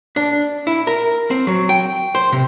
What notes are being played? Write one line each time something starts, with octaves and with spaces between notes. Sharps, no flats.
D4
E4
A#4
C4
F#3
G5
C5
C3